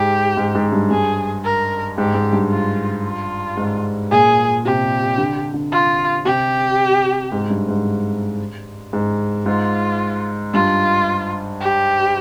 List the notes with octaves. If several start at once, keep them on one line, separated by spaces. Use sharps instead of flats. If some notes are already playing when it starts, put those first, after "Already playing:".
Already playing: G#2 G4
G#2
G#2
G2
G2 G#4
A#4
G#2 G4
G#2
G2
F4
F4
G#2
A#2 G#4
C3 G4
D3
D3
F4
C3 G4
G#2
G2
G#2
G#2
G#2 F4
G2 F4
G4